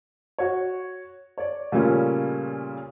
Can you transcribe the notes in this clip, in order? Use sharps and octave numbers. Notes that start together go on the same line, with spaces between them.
F#4 C#5
C#5 D5
A#2 C#3 G3 A3 C#4 F4